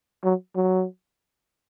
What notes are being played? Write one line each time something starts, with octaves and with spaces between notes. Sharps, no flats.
F#3
F#3